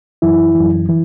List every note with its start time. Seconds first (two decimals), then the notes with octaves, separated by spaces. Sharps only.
0.22 F#2 E3 E4
0.55 E3
0.60 F#2
0.89 E3